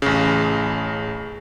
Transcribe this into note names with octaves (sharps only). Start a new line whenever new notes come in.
A1 C#3